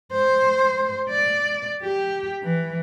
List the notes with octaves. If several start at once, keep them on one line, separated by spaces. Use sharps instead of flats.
C5
D5
G4
E3